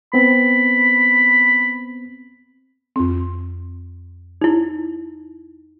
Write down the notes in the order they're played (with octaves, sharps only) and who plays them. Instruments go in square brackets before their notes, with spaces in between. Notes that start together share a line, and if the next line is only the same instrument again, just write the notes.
[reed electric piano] B3 C4 [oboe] B5
[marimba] F2 C4
[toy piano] D#4 E4